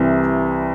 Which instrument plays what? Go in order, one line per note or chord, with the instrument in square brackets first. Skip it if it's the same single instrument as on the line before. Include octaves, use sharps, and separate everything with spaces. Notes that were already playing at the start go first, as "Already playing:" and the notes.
Already playing: [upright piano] C2 C3 E3